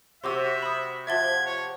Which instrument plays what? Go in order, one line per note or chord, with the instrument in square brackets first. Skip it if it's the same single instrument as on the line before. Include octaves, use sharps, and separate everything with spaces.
[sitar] C3 [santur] F#4 C5 [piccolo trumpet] E5 [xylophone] C6 D6 E6
[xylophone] B5 D#6
[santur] F3 F#5 D6 [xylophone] E5 A6 G7 [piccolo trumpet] G#6
[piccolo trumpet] C#5